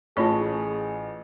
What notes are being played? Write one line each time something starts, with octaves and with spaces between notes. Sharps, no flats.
A1 F4 G#4 C#5 A5 B5 C#6